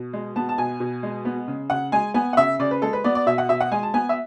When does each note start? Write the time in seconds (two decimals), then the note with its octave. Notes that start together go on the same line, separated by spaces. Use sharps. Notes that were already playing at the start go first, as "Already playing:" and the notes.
Already playing: B2
0.13 G#3
0.36 B3 A5
0.49 A5
0.58 B2 G#5
0.80 B2
1.03 G#3
1.25 B3
1.48 C#3
1.70 C#3 F#5
1.92 G#3 G#5
2.14 B3 G#5
2.33 F#5
2.37 C#3 E5
2.59 C#3 D5
2.71 B4
2.82 G#3 A4
2.93 B4
3.04 B3 D5
3.15 D5
3.26 B2 E5
3.38 F#5
3.49 B2 E5
3.60 F#5
3.72 G#3 G#5
3.83 A5
3.94 B3 G#5
4.09 E5